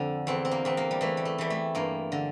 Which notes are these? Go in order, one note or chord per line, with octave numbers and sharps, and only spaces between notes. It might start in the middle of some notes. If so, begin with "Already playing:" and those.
Already playing: F2 D3 D4
E2 C4
C4
A#3
E2 C4
A#3
G3
E3 A3
G3
A3
E3 G3
A3
G2 A#3
D3